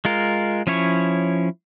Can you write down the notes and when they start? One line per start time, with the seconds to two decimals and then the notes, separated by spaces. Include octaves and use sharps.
0.05 G#3 F4 A#4
0.67 F3 C#4 E4 C#5